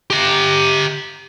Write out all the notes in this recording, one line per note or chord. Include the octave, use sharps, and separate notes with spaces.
G4 A#5